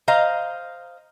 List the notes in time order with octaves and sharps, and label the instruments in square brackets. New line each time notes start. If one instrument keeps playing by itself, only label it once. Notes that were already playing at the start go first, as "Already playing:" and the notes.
[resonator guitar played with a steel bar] C5 D#5 F5 A#5